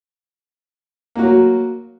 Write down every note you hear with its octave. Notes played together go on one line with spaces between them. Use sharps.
F#3 A#3 F#4